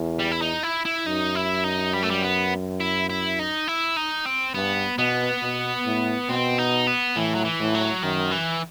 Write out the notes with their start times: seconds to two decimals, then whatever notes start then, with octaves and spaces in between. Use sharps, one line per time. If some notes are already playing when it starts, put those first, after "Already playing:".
Already playing: E2
0.19 G3
0.31 E4
0.42 D#4
0.63 E4
0.85 E4
1.06 F#2 D#4
1.35 E4
1.64 D#4
1.94 G3
2.03 A3
2.11 G3
2.22 B3
2.80 E4
3.09 E4
3.39 D#4
3.68 E4
3.97 D#4
4.26 C4
4.54 G2 B3
4.98 B2 B3
5.42 B2
5.85 A2
6.29 B2 C4
6.58 D#4
6.87 B3
7.16 A2 E3
7.35 F#3
7.45 E3
7.59 A2
7.74 F#3
8.03 F#2 D#3
8.31 E3